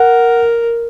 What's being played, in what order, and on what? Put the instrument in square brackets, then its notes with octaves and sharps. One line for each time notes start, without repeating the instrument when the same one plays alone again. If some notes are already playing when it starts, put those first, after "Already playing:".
Already playing: [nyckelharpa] A#4 [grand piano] F#5